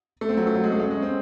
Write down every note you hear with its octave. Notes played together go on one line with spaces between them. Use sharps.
A3
C4
F#3
A3
F#3
G#3
A3
C#4
G#3
C4